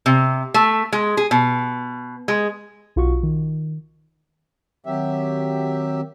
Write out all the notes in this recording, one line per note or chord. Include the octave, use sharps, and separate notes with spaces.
C3
A3
G#3
G#4
B2
G#3
B1 F4 F#4 C#6
D#3
D#3 F#3 C4 G4 E5